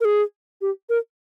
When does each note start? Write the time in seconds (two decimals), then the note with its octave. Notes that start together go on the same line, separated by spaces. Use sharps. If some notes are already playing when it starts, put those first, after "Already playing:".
0.01 A#4
0.05 G#4
0.61 G4
0.90 A#4